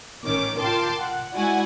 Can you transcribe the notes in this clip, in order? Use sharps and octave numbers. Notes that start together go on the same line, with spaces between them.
A1 D#3 C#4 D6
F4 A#4 G5 A5 C6 D6
F#5
G#3 E4 F#4 D5 F#5 G#5